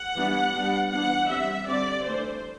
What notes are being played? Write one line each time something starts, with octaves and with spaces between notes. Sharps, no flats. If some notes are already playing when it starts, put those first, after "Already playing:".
Already playing: F#5
E3 G3 B3 D4
G3 B3 D4
E3 B3 D4 F#5
G3 C4 E5
D3 G3 C4 D5
E3 A3 D4 C5